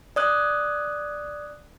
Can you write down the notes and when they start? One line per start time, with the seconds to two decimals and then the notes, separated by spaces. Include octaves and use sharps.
0.16 D5 D#6 F#6